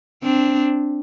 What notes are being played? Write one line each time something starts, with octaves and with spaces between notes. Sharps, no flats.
C4 D4